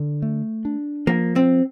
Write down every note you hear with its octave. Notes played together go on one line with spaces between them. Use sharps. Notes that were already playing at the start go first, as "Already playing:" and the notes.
Already playing: D3
A3
D4
F3 A#3
C4